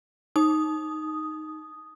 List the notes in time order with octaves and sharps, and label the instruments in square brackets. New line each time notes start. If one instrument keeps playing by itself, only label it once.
[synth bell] D#4 D#6